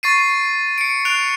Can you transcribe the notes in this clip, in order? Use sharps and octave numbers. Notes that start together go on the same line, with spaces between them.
C#6 A6 C7 D#7
C#7 D7
F#6 C7 D7 F7